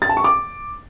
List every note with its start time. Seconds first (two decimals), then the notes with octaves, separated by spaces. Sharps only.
0.02 A6
0.09 A5
0.17 C#6
0.24 D6